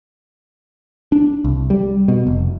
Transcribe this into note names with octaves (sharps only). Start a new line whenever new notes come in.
D4
C2
G3
B2
F1